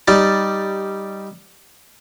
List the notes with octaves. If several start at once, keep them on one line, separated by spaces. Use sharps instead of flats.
G3 D#4 D5